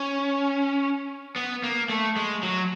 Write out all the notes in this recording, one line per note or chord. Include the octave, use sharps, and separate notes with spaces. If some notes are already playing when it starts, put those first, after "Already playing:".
Already playing: C#4
B3
A#3
A3
G#3
F#3